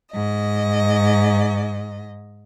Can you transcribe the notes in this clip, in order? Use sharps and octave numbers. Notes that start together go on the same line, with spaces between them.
G#2 D#5